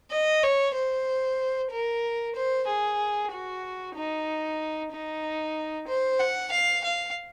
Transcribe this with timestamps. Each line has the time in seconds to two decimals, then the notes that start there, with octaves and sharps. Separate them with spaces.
0.11 D#5
0.43 C#5
0.75 C5
1.71 A#4
2.35 C5
2.67 G#4
3.31 F#4
3.95 D#4
4.92 D#4
5.88 C5
6.19 F#5
6.52 F5
6.84 F5